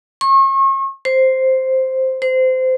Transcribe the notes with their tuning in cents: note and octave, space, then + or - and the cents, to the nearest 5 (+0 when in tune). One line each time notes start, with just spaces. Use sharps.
C#6 -40
C5 +0
C5 -20